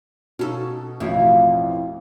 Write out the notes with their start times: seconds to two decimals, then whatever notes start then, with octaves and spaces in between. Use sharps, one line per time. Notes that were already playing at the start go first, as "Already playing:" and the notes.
0.39 B2 C#4 D#4 A4
1.00 A1 F2 B2 F3 E4